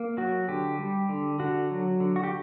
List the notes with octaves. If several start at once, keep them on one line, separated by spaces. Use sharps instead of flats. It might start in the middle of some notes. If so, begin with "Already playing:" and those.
Already playing: A#3
F#3 F#4
D3 G4
G3
D3
D3 F#4
F#3
D3
F#4
G4